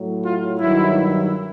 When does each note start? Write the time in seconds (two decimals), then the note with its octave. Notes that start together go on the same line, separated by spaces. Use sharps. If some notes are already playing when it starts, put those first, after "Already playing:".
Already playing: A2 F#3
0.23 F4
0.59 G2 D#3 F#3 E4